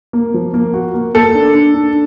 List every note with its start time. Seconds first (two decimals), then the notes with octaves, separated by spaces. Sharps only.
0.13 A#3
0.34 F3
0.54 A#3
0.74 F#4
0.94 A#3
1.14 A#3 A4
1.34 D4
1.54 D4
1.74 D4